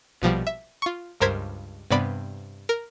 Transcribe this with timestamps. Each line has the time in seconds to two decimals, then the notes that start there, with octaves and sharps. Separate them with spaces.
0.22 A#1 B2 F3 G3
0.47 E5
0.82 F4 C#6
1.21 C#2 G2 A#4 C5 G#6 B6
1.91 G2 C3 B3 D5 B5
2.69 A#4